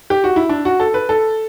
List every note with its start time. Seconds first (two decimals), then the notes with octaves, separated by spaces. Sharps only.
0.10 G4
0.24 F#4
0.36 E4
0.49 D4
0.65 F#4
0.80 A4
0.94 B4
1.09 A4